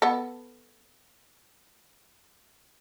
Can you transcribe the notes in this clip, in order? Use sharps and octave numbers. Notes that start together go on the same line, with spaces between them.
B3 A4